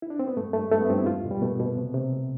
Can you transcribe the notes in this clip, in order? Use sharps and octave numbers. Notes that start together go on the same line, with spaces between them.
E4
D4
C4
B3
G2 A3
G2 A3
G2 A3
B3
G2 C4
E4
E2 F4
B2
G3
B2 A3
B2
C3
C3
C2